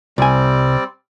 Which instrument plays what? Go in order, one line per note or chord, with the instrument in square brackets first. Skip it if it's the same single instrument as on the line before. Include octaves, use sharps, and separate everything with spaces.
[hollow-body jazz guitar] C2 G#5 [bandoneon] G3 C4 D5